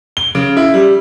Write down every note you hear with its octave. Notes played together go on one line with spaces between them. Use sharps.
G7
C#3
E4
G3